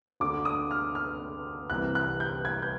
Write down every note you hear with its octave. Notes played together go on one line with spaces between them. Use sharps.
D2 D3 D6
D#6
F6
F6
C2 C3 E3 F#6
F#6
G6
G#6
G6